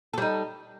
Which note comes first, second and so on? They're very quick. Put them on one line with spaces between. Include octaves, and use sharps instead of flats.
A4 G3 D#4